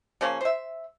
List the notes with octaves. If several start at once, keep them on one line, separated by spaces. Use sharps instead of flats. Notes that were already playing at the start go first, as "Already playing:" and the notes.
C#3 F3 A#3 C#4
C5 E5